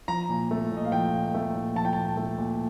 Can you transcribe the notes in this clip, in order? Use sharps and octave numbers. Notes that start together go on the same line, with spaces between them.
F3 A#5
A#2
A3
A#2
D#5
F5
F3 G5
A#2
A3
A#2
F3 A5
G5
A#2 A5
A3
A#2